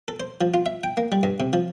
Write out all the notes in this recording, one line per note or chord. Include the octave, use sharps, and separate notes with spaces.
A4
C5
F3
F4
E5
G5
A#3
G3
G2
C3
F3